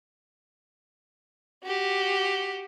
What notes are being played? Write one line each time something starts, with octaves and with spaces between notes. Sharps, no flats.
F#4 G4